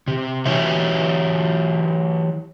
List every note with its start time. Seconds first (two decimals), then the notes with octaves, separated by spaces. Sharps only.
0.08 C3
0.46 E3 F#3 E4 G4 C#5 E5